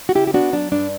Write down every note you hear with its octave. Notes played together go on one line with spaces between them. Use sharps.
F#4
C#3 E4 G4
G4
B3 D4 F#4
F#3 D4
G2 D4